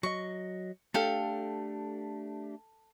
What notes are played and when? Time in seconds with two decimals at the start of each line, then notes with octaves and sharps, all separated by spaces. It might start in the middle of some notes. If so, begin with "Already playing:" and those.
0.03 F#3 D#5 C#6
0.94 A3 D4 G4 A4 F5 G5